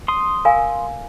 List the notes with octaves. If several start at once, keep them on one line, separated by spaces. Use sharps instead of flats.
C6 D#6
A#4 F5 G#5